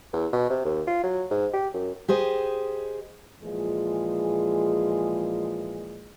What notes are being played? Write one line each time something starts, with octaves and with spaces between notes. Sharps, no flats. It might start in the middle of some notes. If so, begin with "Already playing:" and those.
E2
B2
C3
D#2
F4
F#3
G#2
G4
F#2
G4 G#4 C5 D#5
A#2 E3 F3 G#3 G#4